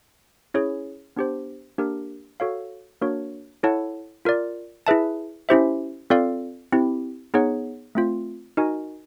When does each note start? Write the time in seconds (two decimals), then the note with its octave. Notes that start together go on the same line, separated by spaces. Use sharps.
0.54 C#4 E4 G#4 C#5
1.16 B3 D4 G4 C5
1.78 A#3 D4 G4 A#4
2.40 F#4 A4 C#5 F5
3.01 A#3 D4 F#4 A#4 C#5
3.63 E4 A4 C#5 F#5 A5
4.25 F4 A#4 D5
4.87 E4 G#4 B4 E5 A5
5.49 C#4 E4 G4 C5 E5
6.10 C4 F4 A4 D5 F5
6.72 C4 E4 G4
7.34 B3 D#4 G#4 C#5 F#5
7.95 A3 C4 F4
8.57 D#4 F#4 A#4 D#5 G#5